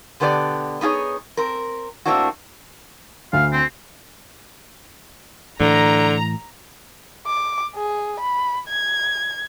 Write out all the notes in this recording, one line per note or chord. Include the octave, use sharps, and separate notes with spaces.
B2 D3 B3 G4 C5 D5
B3 D#4 F4 G#4 C#5
C4 A#4
A2 A#3 C4 D4 E4 F#4
D2 F5
C4
A2 D3 E3 A#5
D6
G#4
B5
G#6